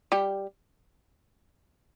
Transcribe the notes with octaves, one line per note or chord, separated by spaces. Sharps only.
G3 G4